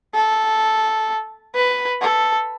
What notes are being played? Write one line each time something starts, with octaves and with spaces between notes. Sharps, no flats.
A4
B4
A4